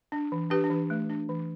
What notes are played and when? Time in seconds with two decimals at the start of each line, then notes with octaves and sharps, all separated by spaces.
0.12 D4
0.32 E3
0.50 D4 G4 B4
0.64 D4
0.70 E3
0.90 A3
1.10 D4
1.29 E3